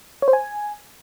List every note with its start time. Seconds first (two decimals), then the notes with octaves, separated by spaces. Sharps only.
0.22 C#5
0.28 C5
0.33 G#5